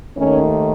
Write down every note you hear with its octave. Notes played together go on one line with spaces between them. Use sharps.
D#2 D#3 A3 C#4